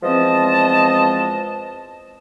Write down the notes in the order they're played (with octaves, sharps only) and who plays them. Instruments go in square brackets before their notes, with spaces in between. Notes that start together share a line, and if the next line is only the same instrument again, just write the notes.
[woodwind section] E2 F3 G#3 C4 D#5 A5